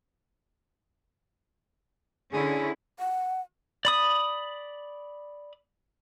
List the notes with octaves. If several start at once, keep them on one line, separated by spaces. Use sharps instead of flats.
D3 C#4 E4 G#4
F#5
D5 B5 D#6